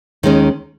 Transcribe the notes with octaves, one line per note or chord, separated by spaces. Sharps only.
D#2 D#3 G#3 C#4